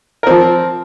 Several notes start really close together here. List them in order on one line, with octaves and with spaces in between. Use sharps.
A#4 C4 F3